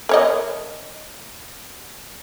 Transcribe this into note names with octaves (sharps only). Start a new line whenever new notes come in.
A#4 C#5 D#5